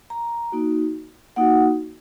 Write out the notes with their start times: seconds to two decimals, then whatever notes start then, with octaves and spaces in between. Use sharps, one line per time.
0.10 A#5
0.52 A#3 D#4 F#4
1.36 A#3 D#4 F#4 F#5